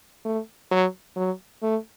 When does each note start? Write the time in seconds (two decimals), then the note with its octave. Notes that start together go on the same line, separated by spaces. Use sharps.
0.25 A3
0.71 F#3
1.16 F#3
1.62 A3